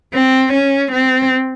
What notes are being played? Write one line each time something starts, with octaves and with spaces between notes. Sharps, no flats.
C4
C#4
C4